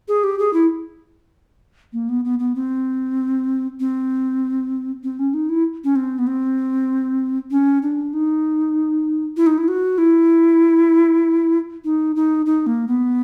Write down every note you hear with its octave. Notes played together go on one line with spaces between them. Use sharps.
G#4
G4
G#4
E4
A#3
B3
B3
B3
C4
C4
C4
C#4
D#4
E4
C#4
C4
B3
C4
C#4
D4
D#4
E4
D#4
E4
F#4
E4
D#4
D#4
D#4
A#3
B3